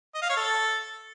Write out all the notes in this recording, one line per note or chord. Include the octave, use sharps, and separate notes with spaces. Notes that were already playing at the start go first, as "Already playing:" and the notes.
D#5
F5
C#5
A4